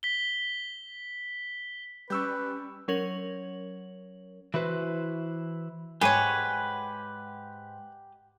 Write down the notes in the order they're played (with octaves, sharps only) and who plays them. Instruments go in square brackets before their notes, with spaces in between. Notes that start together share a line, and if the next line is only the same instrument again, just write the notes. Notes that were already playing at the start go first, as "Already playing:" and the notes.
[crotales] B6 G7
[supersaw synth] G3 [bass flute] C#4 [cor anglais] B4 [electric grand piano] C#6 E6 G6
[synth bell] F#3 C#4 A#4 C#5 F#7
[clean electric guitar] E3 E4 F#4 B4 C5
[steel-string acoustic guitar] G#2 G#3 F#5 [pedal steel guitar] G4 G#5 [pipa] G#4 C#5 [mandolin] B4